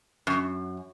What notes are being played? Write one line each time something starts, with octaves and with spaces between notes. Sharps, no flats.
F#2